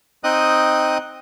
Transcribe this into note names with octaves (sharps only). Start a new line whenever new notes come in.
C4 D#4 D#5 G5 D#6 F#6